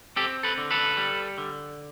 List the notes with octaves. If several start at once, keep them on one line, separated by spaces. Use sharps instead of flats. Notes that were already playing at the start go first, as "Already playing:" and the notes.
C4 G4 A4
A4 B4
D3
A4 B4
G3
D3